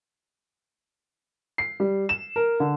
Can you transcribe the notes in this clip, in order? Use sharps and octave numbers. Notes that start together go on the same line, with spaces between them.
C7
G3
E7
A#4
D3